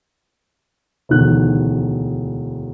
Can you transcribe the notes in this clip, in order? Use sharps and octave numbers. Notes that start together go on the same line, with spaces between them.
E1 D2 D#3 F#6